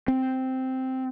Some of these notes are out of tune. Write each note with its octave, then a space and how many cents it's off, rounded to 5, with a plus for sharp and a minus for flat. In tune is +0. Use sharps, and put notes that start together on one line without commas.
C4 -5